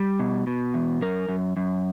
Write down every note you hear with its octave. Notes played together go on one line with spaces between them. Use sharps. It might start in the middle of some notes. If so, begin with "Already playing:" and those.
Already playing: G3
B2
B2
E2
F#2 A#4
F#2
F#2